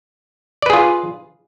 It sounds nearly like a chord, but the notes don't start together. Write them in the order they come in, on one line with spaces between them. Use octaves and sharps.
D5 B4 G#4 F4